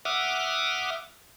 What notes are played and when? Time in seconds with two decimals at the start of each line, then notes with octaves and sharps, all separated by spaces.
0.05 E5 F#5 D6 D#6 F6